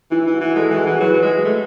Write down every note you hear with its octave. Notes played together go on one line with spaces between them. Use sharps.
E3 E4
E3
F#4
E3
G#3 A4
G#4
E3 F#4
E3 G#4
F#3 B4
F#3
G#3
A3